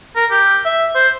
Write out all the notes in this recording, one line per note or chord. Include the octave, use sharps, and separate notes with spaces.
A#4
G4
E5
C5